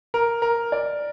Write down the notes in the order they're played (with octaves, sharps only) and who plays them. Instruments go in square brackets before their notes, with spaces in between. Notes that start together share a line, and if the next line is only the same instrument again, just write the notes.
[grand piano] A#4
A#4
D5